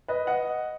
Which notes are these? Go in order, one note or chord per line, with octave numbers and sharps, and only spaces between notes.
B4 D#5
D#5 F#5